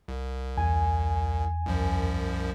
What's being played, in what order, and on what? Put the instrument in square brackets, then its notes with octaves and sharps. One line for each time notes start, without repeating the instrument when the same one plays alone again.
[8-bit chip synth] C2
[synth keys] E2 G#5
[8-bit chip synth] C2 F#2 F3